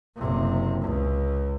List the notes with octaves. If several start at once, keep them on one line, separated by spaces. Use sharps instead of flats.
F#1 C3
C#2